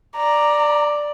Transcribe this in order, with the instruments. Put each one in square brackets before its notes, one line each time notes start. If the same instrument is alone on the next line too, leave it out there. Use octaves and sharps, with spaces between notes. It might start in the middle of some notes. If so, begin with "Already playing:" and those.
[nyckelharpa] D5 [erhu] A#5